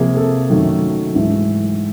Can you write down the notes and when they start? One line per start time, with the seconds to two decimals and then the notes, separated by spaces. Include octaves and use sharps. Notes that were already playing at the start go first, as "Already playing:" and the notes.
Already playing: C3 F3 A#3 G#4
0.17 A4
0.50 F#2 D#3 F#3 A3
1.15 G#2 E3 A3